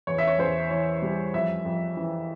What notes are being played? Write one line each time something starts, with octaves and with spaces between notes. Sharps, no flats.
E2 C#5
E5
C#5
E2 C5
E3 C#5
G3
F2 E5
F2
E3